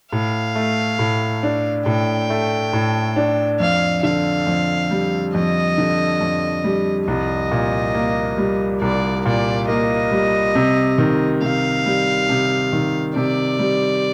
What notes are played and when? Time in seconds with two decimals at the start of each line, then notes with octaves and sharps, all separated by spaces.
0.12 A2 F5
0.55 A3
0.99 A2
1.43 D4
1.86 A2 G5
2.30 A3
2.73 A2
3.16 D4
3.60 F2 F5
4.03 D3 F5
4.47 F2
4.91 G3
5.34 F2 D#5
5.78 D3
6.21 F2
6.64 G3
7.07 C2 D#5
7.51 A#2
7.94 A#3
8.38 G3
8.81 C2 D5
9.25 A#2 D5
9.68 A#3 D#5
10.12 G3
10.55 C3
10.98 D#3
11.42 C3 F5
11.86 G3
12.29 C3
12.73 D#3
13.16 C3 D5
13.59 G3